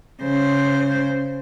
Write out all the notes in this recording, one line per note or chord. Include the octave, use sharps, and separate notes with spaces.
C#3 C5